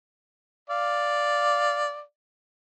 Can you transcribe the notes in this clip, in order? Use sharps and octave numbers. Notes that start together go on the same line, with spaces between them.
D5 F5